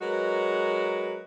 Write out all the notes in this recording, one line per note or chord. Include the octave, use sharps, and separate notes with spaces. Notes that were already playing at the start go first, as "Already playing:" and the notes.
F#3 G#3 F#4 A#4 B4